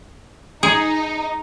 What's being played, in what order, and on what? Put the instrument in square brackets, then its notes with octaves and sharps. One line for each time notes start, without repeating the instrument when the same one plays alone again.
[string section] D#4 [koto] G#4